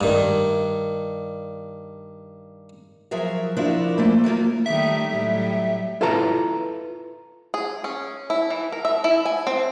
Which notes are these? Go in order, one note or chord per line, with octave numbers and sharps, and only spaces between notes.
G2 D#3
F3 F#3 G#4 A#4 E5
F3 D4 E4 F#4 A#4
F3 A3 A#3
F#3 A3 A#3 F4
D#3 G3 A3 E5
A2 F#3 G3
E4 F4 A4 B4 A5 A#5
G#4
C#4
E4
E3
A#4
E5
E4
G#5
C4